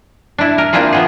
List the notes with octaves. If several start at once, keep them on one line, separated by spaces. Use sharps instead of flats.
D4 E4
A#4
A#3 C4 D4 E4 F4 G#4
F3 B3 G#4